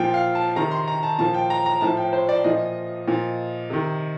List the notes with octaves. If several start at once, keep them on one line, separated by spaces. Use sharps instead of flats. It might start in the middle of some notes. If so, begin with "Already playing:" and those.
Already playing: A#2 F3 G5
F5
A5
C3 D#3 A#5
C6
A#5
A5
A#2 F3 A5
G5
A#5
A#5
A2 F3 A5
G5
C5
D5
A#2 F3 D#5
A#2 F3
C3 D#3